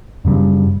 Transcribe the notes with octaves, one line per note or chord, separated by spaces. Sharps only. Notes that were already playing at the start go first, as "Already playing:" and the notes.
F#2 C#3 G3